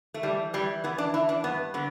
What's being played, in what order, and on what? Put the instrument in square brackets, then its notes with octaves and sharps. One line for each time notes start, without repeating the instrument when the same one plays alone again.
[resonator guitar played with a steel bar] A3
E3 G3
E3 G3
E3 B3
D4
E3 E4
D4
G2 B3
D3 B3